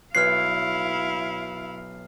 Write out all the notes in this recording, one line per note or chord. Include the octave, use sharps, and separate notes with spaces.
B1 E4 C#5 F5 F6 F#6 C7